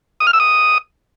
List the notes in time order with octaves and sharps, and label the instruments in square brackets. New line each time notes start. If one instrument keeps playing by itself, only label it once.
[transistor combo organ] D#6
F6
E6
D#6